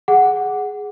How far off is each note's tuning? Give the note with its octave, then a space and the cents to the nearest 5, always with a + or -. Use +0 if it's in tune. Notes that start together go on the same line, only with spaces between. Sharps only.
G#4 +0 F#5 +0